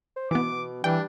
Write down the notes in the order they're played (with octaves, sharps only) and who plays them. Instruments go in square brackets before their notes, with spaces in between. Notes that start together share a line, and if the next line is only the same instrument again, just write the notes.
[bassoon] C5
[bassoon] B2 [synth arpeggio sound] E3 B3 [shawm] D6
[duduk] E3 [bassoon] G3 [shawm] D4 [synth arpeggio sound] G5